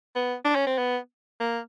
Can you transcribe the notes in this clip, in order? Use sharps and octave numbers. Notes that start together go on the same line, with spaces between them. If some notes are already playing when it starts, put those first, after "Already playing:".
B3
D4
C#4
C4
B3
A#3